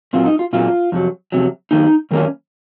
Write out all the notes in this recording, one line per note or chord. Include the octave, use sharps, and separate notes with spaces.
A#2 F#3 C4 F4
D#4
F4
A#2 F#3 C4 F4
F2 C3 F#3
F2 C3 F#3
F#2 D#3 A#3 D#4
F#2 D#3 A#3 C#4